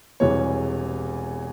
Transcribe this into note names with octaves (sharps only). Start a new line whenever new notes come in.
E1 E2 C3 E3 G3 C#5